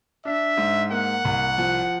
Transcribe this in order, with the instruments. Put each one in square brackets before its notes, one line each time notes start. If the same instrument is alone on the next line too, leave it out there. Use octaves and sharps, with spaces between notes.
[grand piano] D4 [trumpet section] E5
[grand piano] G#2
[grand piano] A#3 [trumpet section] F#5
[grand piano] C2
F3